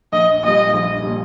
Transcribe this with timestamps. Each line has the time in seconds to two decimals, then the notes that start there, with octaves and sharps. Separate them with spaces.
0.12 A#1 D#5
0.43 A#2 G3 D#5
0.74 A#1
1.03 A#2 G3